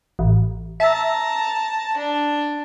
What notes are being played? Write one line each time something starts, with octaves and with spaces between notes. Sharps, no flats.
A1
E5 A5 A#5
D4